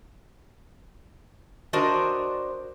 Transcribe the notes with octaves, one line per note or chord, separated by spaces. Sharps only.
D4 F#4 A#4 C5 D5 D#5